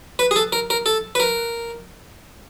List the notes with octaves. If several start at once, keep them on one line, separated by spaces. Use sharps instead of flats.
B4
G#4
A4
A#4
A#4
A4
B4
A#4